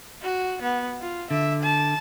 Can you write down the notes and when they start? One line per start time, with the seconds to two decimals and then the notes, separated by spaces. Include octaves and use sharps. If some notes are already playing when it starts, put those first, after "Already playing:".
0.22 F#4
0.62 B3
1.01 F4
1.31 D3 E5
1.63 A5